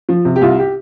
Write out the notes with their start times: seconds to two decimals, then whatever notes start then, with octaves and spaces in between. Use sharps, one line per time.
0.09 F3
0.25 C3
0.36 G4
0.41 C2 F4
0.59 G4